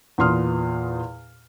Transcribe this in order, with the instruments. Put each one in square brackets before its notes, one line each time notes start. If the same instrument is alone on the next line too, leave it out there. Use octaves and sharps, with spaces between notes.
[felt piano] E2 A#2 B4 C6 D#6 F6